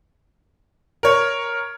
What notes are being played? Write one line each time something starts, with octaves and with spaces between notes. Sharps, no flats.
A#4 C#5